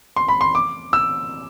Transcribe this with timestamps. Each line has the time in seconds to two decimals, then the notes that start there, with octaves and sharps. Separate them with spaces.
0.16 C6
0.28 B5
0.41 C6
0.55 D6
0.93 E6